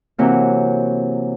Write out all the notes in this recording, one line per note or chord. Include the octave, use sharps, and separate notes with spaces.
C3 E3 F#3 A#3